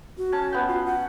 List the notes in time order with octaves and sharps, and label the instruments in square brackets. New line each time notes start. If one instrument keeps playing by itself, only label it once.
[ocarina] F#4
[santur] C#4 A5
B3 G5
[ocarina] F4
F#5